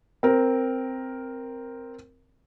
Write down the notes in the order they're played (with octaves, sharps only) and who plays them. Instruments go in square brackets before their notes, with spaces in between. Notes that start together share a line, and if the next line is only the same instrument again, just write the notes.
[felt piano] C4 A#4